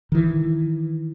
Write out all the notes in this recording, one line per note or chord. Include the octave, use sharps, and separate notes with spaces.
D#3 E3